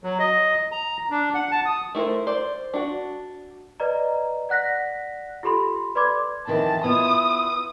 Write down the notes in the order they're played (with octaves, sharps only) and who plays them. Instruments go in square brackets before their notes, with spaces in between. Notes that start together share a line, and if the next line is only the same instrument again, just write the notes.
[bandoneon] F#3
D#5
A#5
D4
F#5
A5
D#6
[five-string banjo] A3 E4 A#4 C5
C5 D5
D4 F#4
[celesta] B4 D5 D#5 A#5
D5 F#5 F#6 A#6 B6
F4 G4 A4 B5 C6
B4 D5 B5 C6 D6 G#6
[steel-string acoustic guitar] F2 D#3 E3 [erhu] A5
[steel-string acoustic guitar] B3 E4 F4 [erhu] D#6